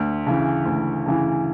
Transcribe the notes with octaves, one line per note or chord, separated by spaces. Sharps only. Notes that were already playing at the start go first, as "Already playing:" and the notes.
Already playing: D2
C#3 E3
D2
C#3 E3